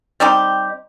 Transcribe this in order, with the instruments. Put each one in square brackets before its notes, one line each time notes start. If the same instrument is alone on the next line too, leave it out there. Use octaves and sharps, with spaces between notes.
[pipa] G3 C4 D#4 G4